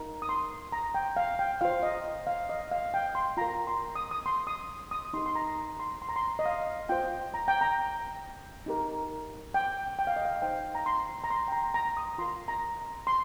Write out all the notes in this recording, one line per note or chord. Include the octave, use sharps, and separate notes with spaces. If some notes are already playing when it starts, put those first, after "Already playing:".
Already playing: D#4 A#4
D#6
C6
A#5
G5
F5
G5
F4 C5 F5
D#5
F5
D#5
F5
G5
C6
F4 A#4 A#5
C6
D#6
D#6
C6
D#6
D#6
D#4 G4 A#4 C6
C6
A#5
C6
C6
A#5
C6
D#5
F5
F4 C5 G5
A#5
G5
A#5
D#4 G4 A#4
G5
G5
F5
D#5
F5
D#4 C5 G5
A#5
C6
A#5
C6
G5
A#5
A#5
D#6
F4 A#4 C6
A#5
C6